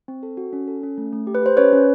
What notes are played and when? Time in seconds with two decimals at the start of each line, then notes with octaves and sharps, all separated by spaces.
0.08 C4
0.23 A4
0.37 F#4
0.53 C#4
0.68 A4
0.83 C#4
0.98 A3
1.13 A3
1.27 G4
1.35 B4
1.43 G4 C5
1.57 C#4 B4 C#5
1.73 C#4